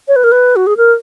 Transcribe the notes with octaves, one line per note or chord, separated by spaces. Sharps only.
C#5
B4
A#4
B4
F#4
G#4
A#4